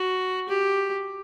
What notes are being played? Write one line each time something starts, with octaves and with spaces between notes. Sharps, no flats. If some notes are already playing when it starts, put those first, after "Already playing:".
Already playing: F#4
G4